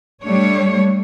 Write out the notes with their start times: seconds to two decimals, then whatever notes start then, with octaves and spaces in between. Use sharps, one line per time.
0.24 G3 A3 D4 C#5